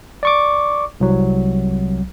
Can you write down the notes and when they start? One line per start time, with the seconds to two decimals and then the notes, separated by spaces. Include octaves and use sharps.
0.23 D5 C#6 D6
1.00 C2 F#3